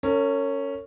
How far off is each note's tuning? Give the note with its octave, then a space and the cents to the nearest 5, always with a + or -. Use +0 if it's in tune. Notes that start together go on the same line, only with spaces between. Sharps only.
C#4 +0 A#4 -40